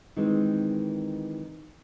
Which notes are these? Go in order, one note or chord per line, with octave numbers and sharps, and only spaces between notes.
D#3 E3 G#3 C4 D#4